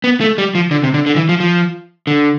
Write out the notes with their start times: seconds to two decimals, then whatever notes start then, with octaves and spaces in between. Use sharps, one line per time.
0.04 B3
0.21 A3
0.38 G3
0.55 F3
0.71 D3
0.84 C3
0.94 D3
1.06 D3
1.16 E3
1.29 F3
1.40 F3
2.07 D3